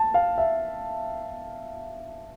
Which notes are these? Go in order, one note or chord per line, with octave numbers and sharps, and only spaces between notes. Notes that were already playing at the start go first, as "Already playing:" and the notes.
Already playing: A5
F5
E5